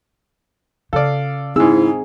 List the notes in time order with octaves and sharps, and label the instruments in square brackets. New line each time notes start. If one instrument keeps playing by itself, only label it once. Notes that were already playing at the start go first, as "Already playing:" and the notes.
[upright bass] C#3 [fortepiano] A4 D5 [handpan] F5
[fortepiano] G#2 E6 [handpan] C4 D#4 G#4 [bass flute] E4